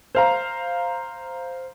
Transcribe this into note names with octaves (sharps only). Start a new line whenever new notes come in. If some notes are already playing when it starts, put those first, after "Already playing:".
C5 F5 A#5